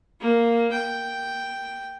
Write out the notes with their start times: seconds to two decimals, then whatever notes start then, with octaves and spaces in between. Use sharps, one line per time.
0.20 A#3
0.71 G5